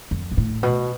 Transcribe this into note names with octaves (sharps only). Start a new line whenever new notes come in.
F2
B2
A2
B2